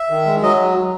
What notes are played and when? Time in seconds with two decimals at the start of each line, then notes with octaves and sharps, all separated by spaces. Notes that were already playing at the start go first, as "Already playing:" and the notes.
Already playing: E5
0.10 D#3
0.26 G#3
0.43 F#3 D#5